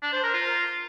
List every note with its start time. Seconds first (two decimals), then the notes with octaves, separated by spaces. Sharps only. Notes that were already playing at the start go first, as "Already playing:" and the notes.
0.02 D4
0.13 C5
0.23 A#4
0.34 F4